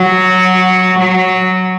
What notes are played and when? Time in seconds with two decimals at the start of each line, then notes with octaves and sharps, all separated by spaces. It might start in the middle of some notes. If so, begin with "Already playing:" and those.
Already playing: F#3
0.98 F#3